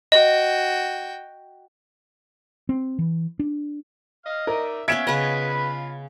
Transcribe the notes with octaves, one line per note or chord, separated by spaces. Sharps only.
F#4 D#5 G5
C4
E3
D4
D#5 F5 F6
D#4 A#4 D5 E5
B3 C#4 B4 E5 F5 G#6 D7 E7
C#3 F4 B4 D#5 B5